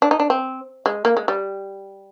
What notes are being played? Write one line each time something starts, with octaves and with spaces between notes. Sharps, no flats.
D4
D#4
D4
C4
G#3
A#3
G#3
G3